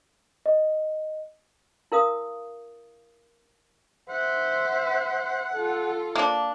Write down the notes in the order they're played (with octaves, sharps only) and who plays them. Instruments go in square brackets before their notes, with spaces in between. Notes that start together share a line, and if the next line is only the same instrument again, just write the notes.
[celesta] D#5
[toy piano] E4 A#4 F5 D#6
[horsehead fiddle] C5 E5 [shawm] F#5
[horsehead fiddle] F4 A4
[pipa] A#3 D4